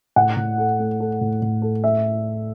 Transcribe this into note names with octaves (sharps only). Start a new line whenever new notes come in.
A2 F#5
A2
A4
A3
A4
A2
A2
A4
E5